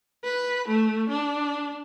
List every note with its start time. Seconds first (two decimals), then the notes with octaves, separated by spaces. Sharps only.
0.24 B4
0.69 A3
1.10 D4